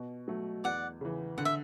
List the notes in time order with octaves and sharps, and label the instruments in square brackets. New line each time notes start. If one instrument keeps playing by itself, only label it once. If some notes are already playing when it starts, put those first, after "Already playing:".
Already playing: [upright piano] B2
F#3 A3
[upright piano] E2 [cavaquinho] D5 F#5
[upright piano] C#3 E3
[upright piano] D3 [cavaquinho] F#5
[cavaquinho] E5